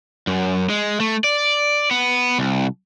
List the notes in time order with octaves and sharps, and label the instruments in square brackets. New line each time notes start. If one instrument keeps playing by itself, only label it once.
[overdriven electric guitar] F#2
G#3
A3
D5
B3
C2